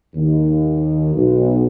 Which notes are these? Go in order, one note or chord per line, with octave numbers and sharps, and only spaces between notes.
D#2
B1